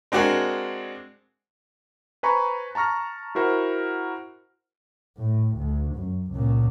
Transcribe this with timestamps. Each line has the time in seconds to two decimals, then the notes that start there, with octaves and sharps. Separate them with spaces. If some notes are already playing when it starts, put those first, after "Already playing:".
0.12 G#3 C4 D4 F#4 G#4 A#4
2.23 B4 C5 G#5 A#5 B5 C#6
2.75 A5 A#5 C#6 F6 A#6
3.35 E4 F#4 A#4 C5 F#5
5.17 A2
5.57 D2
5.95 F#2
6.31 C#2 A#2